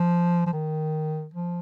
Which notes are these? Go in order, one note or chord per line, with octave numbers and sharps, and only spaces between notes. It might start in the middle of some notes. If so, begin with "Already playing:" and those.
Already playing: F3
F3
D#3
F3